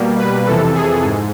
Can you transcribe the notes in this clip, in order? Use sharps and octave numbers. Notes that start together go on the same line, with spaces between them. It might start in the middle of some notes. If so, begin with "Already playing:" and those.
Already playing: B2 G3 A#3
B4
F2 C3 E3 A4
G#4
G#2